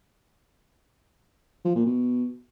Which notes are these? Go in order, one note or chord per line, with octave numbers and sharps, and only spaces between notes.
F3
A#2
B2